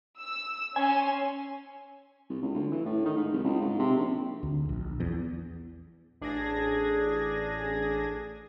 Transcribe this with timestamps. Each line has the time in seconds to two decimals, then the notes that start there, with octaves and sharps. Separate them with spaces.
0.20 E6
0.76 C#4 G#5 C6
2.30 C2
2.42 C#2
2.54 D2
2.72 E3
2.86 A2
3.05 D#3
3.17 G#2
3.33 C2
3.44 C#2
3.61 G#2
3.79 C3
3.97 A#1
4.43 D2
4.69 A#1
5.00 E2
6.21 A1 D4 G#4 G#6 A#6